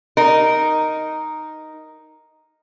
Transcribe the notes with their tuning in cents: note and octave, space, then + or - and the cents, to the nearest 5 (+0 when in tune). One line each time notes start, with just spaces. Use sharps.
D#4 +0 A#4 +0